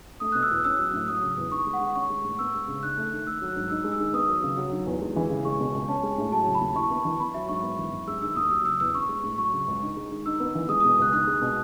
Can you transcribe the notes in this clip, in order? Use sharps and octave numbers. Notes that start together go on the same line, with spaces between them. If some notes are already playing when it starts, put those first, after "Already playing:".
A3 D#6
B2 F#6
E6
E2
C#4 E6
F#3
A2
F#3 D#6
C#3
E2
D#4 C#6
G#3
F#5
D#3
C#4 C#6
G#3
A2
B3 E6
G#3
C#3
D#4 F#6
A3
D#3
A3 E6
F#3
F#6
G#2
D#4 E6
G#3
E6
D#3
B3 D#6
F#3
C#3
F#3
D#3
E2
G#3
E3
C#3
G#3 C#6
B2
C#2
C#4 A5
G#3
A2
F#3 A5
C#3
B5
D#2
E4 C#6
B3
E3
B3 B5
F#3 E5
G#2 C#6
B3
E3
F#2
G#3 E6
D#3 E6
D#2 D#6
F#3 E6
C#3 E6
E2 E6
C#4 C#6
G#3
A2
F#3 C#6
C#3
C#2
D#4
G#3
D#3
D#4 E6
B3
E3
G#3 D#6
D#6
B2
C#2 F#6
D#4 F#6
G#3
B2